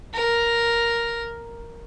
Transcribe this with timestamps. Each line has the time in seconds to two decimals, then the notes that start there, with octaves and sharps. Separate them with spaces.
0.14 A#4